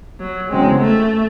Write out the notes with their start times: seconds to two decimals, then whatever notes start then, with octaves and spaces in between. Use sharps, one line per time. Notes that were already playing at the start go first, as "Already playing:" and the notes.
0.20 F#3
0.50 E2 C#3 F#3 G#3 C4
0.79 A3